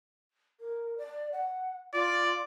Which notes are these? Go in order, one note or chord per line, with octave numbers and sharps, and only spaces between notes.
A#4
D5
F#5
F4 D5